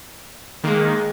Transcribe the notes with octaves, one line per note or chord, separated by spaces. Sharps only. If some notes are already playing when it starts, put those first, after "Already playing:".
D#3 G#3 A#3